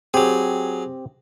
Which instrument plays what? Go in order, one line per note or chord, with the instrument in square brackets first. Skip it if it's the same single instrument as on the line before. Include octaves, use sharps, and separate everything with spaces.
[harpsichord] F#3 G#4 [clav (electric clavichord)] C4 G4